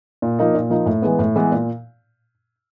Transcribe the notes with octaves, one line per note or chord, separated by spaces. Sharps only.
A#2
F3 A#3 D#4
A#2
F3 A#3 D#4
A2
E3 G#3 B3
A2
E3 G#3 B3
A#2